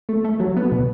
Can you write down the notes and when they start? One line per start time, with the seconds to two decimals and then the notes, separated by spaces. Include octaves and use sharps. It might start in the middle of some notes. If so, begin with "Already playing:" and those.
0.09 A3
0.24 A3
0.40 F#3
0.56 B3
0.72 B2